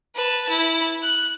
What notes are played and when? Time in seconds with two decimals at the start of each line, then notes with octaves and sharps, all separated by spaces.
0.15 B4 A5
0.49 E4
1.03 F#6